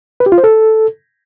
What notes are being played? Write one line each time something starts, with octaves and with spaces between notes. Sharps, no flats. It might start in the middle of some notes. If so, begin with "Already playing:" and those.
B4
G4
F4
C5
A4